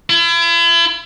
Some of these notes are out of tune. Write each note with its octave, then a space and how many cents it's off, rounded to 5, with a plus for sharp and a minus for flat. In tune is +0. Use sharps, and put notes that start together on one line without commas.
E4 +40